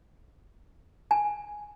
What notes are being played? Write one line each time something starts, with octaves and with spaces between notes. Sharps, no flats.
G#5